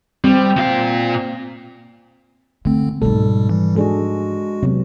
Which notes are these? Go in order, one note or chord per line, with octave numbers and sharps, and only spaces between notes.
G3 C4
A#2 F5
D3 A3 C4
G#2 B2 F3 G3 A4
E3 G3
G#3 D4 F#4 G#4 A4
C3 F#3 B3